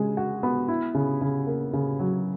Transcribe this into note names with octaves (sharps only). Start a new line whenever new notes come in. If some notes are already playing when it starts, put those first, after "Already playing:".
Already playing: C#3 G#3
F#4
B3
E4
C#3
C#3
A#3
C#3
F#3